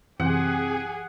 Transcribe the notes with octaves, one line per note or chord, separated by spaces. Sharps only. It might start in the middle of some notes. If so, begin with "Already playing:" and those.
F#2 C3 E3 G4 G#4 F#5